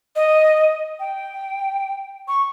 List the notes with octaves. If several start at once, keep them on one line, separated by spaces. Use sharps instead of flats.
D#5
G5
C#6